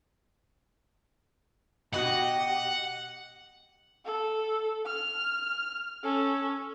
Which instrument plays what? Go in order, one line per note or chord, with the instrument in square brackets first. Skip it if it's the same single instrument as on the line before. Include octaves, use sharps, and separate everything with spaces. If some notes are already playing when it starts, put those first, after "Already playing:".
[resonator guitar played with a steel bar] B2 F#4 [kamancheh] G4 D#5 [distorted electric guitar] F#5
[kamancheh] A4
F6
C#4 A4